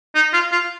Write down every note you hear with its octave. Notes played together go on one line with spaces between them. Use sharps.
D#4
F4
F4